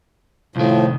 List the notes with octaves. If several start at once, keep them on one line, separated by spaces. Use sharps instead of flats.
C2 A2 D#3 F3